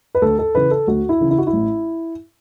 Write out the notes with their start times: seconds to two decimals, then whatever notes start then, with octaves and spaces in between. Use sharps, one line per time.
0.15 B4
0.22 D2 A4
0.39 A4
0.55 C#3 E3 B4
0.71 A4
0.87 D2 F#4
1.09 E4
1.20 C#3 E3
1.31 E4
1.38 F#4
1.47 E4
1.53 A1